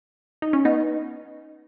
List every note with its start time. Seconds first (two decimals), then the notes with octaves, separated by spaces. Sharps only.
0.42 D#4
0.53 C#4
0.65 B3 D#4